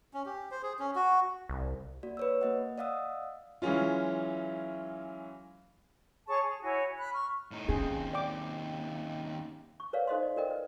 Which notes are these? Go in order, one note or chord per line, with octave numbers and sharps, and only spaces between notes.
C#4
G4
C5
G#4
C#4
F#4
C2
A#3 F#4 D5
B4 C#5 E6
A#3 D#5 F#5
D5 D#5 F5 F#5 D#6 E6
E3 F#3 G#3 C#4 F4
G#4 C#5 A5 C#6
G#4
E4 F#4 C#5 G#5
B5 F#6
C#6 F6
A2 D#4
D#2 C4 C#4 G#4
D5 G5 D6
C#6
A#4 B4 C#5 D5 F5
D#4 A4 C5 D#5 F5 C6
D5
F#4 A4 A#4 D5 D#5 G5
B4